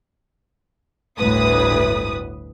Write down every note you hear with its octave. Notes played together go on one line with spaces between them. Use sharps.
G1 D2 A2 B4 D#6